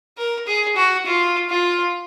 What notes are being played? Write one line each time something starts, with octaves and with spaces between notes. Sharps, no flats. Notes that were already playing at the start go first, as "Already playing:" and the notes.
A#4
G#4
F#4
F4
F4